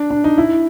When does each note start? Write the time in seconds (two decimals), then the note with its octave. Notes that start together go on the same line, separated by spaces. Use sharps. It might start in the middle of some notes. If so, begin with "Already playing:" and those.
Already playing: D4
0.10 D4
0.24 D#4
0.38 E4